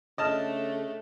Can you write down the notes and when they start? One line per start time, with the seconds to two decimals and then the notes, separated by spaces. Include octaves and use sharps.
0.18 C#3 A3 D4 D#5 A5 F6